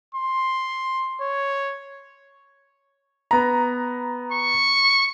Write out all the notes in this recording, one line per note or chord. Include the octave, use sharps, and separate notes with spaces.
C6
C#5
B3 A#5
C#6